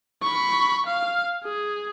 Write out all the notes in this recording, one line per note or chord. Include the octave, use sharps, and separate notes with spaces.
B5 C#6
F5
G#4